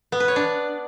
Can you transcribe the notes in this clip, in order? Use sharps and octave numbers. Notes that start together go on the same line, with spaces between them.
B3
B4
C#5
D4